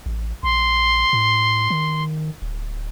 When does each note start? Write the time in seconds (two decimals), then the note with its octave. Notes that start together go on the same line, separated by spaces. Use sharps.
0.06 A1
0.43 A#1 C6
1.13 A2
1.70 D#3
2.42 D1